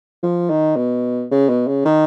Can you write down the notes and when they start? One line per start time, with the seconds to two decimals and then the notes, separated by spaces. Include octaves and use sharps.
0.23 F3
0.49 D#3
0.76 B2
1.31 C#3
1.49 B2
1.67 C#3
1.85 D#3